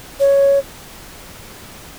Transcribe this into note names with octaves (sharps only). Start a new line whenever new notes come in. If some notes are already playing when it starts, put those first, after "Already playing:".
C#5